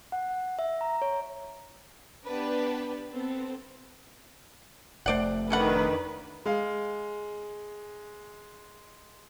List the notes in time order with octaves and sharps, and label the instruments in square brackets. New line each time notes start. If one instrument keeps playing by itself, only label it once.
[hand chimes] F#5
E5
A#5
C#5
[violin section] B3 D4 G4 B4
B3 C4 A4
[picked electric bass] F1 A3 [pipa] C5 D5 F#5
[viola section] D#3 D4 B4 [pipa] C#4 A4 F#5
[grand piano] G#3 F5